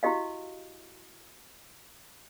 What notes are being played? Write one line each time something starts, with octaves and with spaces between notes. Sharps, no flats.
E4 F#4 G4 D#5 F5